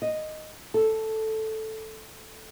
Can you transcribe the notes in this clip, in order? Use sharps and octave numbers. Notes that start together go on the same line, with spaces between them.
D#5
A4